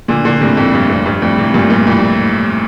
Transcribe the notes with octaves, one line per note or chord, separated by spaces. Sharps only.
A#2 D3
A#2 D3
A2 C3
F2 A2
G2
F2
G2
F2 A2
A2 C3
G2 A#2
G2 A#2
F2 A2